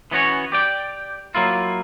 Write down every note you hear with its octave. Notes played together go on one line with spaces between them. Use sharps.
E3 B3 C#4 F#4 C#5
G4 D5 G5
F#3 A#3 E4 F4